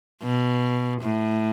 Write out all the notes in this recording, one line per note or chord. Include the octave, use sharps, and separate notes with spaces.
B2
A2